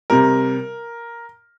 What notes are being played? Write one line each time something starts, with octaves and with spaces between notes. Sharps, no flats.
C3 G3 A#4